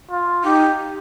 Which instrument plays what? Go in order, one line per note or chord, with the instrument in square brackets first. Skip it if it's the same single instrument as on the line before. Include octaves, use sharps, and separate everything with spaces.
[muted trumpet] F4
[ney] D#4 [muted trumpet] G4